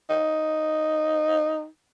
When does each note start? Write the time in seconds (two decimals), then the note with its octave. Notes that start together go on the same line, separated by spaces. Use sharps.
0.10 D#4